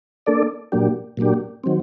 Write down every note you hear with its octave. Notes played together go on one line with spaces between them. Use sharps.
A#3 D4 A4 D5
A#2 F#3 A#3 D4 G4
A#2 F#3 A#3 D4 G4
D#3 F#3 C4